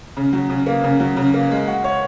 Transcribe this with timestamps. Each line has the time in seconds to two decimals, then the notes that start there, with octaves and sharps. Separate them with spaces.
0.17 C#3
0.33 F#3
0.50 C#3
0.66 A#3
0.84 C#3
1.00 F#3
1.17 C#3
1.34 A#3
1.51 G#3
1.67 F#4
1.84 C#5